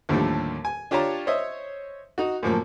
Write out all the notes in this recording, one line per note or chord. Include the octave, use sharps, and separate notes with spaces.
D#2 A2 D3 F3 G3 A3
G#5
D4 F4 G4 C#5 A5 A#5
C5 C#5 D#5 E5
D#4 F#4
F#2 A2 F3 A#3